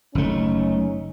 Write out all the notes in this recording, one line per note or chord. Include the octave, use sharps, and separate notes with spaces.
F#1 A3 C#4 D#4